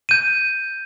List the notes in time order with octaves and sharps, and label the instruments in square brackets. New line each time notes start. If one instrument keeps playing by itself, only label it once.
[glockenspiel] G6 D#7